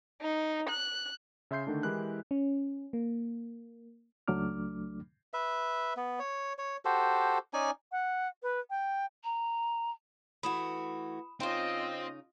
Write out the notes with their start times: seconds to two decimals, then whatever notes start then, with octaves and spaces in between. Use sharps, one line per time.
0.21 D#4
0.69 F#6
1.51 C#3 E5 C6 G6 C7
1.67 D3 D#3 A3 D4
1.83 E3 G#3 E4 G4 A#4 F#6
2.31 C#4
2.93 A#3
4.28 C#2 F#3 A3 D4 D6 F6
5.33 B4 E5
5.97 B3
6.19 C#5
6.58 C#5
6.85 F#4 G4 A4 C5
7.53 C#4 D#4 D5 G#5
7.91 F#5
8.43 B4
8.70 G5
9.24 A#5
10.43 E3 A3 F#4 B5 D#6 E7
11.40 C#3 C4 D#4 F4 D#5 G5 C6